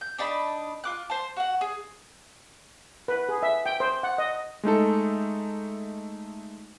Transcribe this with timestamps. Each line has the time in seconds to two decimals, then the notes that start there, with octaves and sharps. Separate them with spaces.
0.01 G6
0.18 D4 D#4 A5 B5
0.84 F4 D6 F#6
1.10 C5 A5
1.36 F#4 F#5
1.61 G#4
3.08 B4
3.29 G#4
3.43 E5
3.66 G5
3.80 C5
4.03 F#5
4.18 D#5
4.63 G#3 A3 D#4 A4